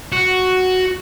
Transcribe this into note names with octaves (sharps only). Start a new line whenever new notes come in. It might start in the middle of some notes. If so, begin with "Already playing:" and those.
F#4